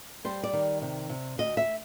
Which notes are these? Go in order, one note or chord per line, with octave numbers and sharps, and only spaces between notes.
G3 C5
D5
D#3
C3
C3
D2 D#5
E5